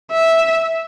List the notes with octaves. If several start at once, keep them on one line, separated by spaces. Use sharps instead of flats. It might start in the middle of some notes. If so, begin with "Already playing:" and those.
E5